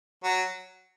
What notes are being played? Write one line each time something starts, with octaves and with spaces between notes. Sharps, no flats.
F#3